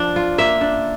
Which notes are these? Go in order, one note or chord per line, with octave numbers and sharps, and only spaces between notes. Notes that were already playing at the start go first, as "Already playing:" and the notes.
Already playing: F3 D4 D5
F4
A#3 E5
D4